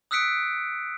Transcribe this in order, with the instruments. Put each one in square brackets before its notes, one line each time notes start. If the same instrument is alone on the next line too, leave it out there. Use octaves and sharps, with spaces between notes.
[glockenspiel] D#6 E6 F#6 B6 C#7 D7